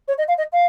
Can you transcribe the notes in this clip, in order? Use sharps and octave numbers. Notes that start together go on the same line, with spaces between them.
C#5
D#5
F5
D#5
F5